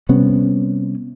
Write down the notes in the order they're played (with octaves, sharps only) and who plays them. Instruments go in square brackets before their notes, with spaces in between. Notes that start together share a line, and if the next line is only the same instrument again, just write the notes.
[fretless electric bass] C3 G3 B3 C#4